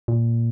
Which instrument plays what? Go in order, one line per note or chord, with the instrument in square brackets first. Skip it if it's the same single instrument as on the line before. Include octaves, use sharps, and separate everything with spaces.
[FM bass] A#2